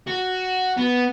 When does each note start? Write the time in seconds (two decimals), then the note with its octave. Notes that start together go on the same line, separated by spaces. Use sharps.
0.07 F#4
0.77 B3